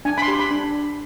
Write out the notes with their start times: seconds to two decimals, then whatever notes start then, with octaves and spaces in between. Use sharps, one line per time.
0.05 D4 G#5
0.18 B5
0.22 C6
0.28 G4
0.39 B5
0.51 D4